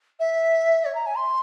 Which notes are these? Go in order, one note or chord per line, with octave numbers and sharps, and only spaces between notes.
E5
C#5
A#5
G#5
C6